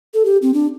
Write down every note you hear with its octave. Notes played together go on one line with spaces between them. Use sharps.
A4
G4
C4
D4